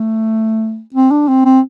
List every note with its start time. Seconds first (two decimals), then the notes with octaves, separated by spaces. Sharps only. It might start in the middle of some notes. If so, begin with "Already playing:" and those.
Already playing: A3
0.94 C4
1.11 D4
1.28 C4
1.45 C4